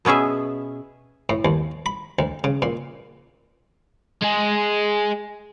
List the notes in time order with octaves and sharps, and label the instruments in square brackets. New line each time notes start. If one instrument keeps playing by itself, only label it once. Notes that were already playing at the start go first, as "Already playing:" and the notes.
[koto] B2 B3 C#4 G#4 E5
[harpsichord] A2
D#2
B5
D2
C#3
A#2
[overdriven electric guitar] G#3 G#4